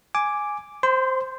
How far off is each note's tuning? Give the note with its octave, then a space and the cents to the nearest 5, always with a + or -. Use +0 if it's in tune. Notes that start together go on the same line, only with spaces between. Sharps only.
G#5 +0 D6 +0
C5 +0 C6 -35